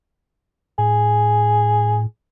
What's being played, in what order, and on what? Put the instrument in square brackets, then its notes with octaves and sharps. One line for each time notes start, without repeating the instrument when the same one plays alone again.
[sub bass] A2 [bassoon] G#4